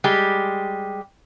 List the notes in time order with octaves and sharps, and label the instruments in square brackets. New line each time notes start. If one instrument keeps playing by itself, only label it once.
[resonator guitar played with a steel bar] G3 G#3 G4